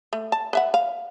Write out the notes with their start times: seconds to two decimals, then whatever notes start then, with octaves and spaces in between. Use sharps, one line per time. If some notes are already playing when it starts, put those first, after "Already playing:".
0.13 A3
0.32 A5
0.53 B4 E5 F#5
0.74 F5